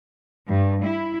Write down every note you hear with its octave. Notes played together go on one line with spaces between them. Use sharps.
G2
E4